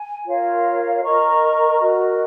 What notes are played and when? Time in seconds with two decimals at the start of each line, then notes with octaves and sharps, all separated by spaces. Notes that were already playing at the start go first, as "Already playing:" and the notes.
Already playing: G#5
0.26 F4 A#4 C#5 F5
1.02 A#4 D#5 A#5 C#6
1.79 F#4 A#4 D#5